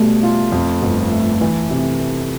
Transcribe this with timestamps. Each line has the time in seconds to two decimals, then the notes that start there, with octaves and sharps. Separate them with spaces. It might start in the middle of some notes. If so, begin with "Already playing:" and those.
Already playing: B2 G3 A3
0.23 F4
0.52 F2
0.82 G1
1.12 A3
1.41 E3
1.70 C3